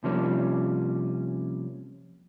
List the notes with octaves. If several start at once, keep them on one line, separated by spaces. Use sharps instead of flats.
C3 F3 G3 A#3 C#4